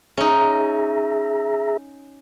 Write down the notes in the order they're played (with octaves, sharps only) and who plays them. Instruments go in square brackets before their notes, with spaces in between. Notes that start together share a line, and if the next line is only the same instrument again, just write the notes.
[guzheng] C#4 D#4 [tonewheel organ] G#4 E5 A#5